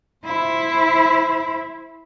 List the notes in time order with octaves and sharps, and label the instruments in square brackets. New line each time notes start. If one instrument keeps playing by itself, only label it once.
[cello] E4 C5